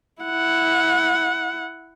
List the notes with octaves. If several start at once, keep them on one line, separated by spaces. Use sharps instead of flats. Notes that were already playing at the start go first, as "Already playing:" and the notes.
E4 F#5